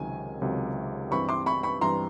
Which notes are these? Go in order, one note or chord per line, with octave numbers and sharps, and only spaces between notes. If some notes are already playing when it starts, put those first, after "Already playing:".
Already playing: C#2 C3 D#3 F#3 G#5
C#2 C3 D#3 F#3
G2 E3 G3 C4 B5 C#6
C6 D6
B5 C#6
B5 C#6
G2 E3 G3 C4 A#5 C6